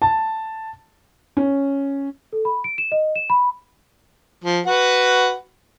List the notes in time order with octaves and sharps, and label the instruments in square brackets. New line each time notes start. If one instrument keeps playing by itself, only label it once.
[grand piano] A5
[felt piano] C#4
[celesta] A4
B5
D7
E7
D#5
E7
B5
[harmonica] F3
F#4 B4 F#5